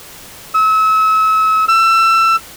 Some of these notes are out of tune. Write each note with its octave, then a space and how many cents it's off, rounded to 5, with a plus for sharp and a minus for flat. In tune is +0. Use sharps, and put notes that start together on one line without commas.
E6 -35
E6 +25